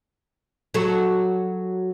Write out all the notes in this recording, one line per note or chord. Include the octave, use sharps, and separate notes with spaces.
F#3 F#4 A4